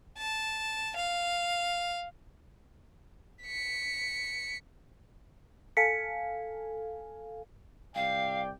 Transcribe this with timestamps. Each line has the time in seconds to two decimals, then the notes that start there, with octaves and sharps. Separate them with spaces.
0.17 A5
0.96 F5
3.43 B6 C#7
5.77 A4 F5 G#5 B6 C#7
7.95 C2 D5 F5 G5